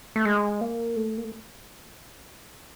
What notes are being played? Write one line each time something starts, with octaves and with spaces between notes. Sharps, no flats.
A3
G#3
A#3
A3
A#3
A3